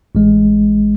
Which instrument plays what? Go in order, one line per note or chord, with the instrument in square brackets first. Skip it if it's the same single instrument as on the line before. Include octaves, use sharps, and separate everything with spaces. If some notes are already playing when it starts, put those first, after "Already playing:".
[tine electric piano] A1 G#3